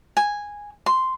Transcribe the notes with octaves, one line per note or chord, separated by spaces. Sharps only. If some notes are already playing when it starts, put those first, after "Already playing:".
G#5
C6